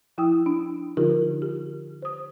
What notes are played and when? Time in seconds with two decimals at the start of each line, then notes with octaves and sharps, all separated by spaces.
0.18 F3 E4 G5 D#6 E6
0.46 D4
0.97 D3 F3 D#4 F4 G4 A#4
1.42 G4
2.02 C5 D#6